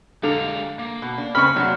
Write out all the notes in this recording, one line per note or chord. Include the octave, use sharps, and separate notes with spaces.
D3 G#3 G4 F5 A#5
A#3
B2
D4
C#3 C4 B5 C#6 F6
C3 F#3 D4 F#4